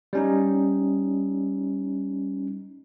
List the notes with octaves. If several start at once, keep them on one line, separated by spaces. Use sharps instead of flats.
G3 C#4 D#4